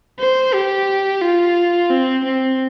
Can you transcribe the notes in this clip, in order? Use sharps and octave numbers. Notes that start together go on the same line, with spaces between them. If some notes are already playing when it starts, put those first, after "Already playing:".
C5
G4
F4
C4
C4